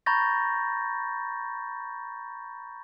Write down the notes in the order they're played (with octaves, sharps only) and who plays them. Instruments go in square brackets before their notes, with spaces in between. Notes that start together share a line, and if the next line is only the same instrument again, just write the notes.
[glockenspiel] A#5 B5 C#6 G6 A6 A#6